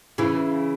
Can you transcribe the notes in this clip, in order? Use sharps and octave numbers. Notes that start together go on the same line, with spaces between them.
C#3 E3 E4